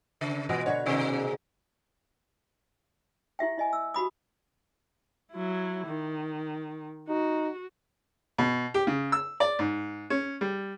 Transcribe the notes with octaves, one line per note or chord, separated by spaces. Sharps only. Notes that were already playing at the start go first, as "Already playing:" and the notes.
C#3
B2 E3 G#3 B3 F#4
D3 F#4 B4 C#5
G#2 C3 D#3
E4 G4 E5 G5
E4 D#5 G#5
E6
F#4 G4 B5 D#6
F#3 E4
D#3
D#4 F#4
B2
G4
C#3
E6
D5
G#2
C#4
G3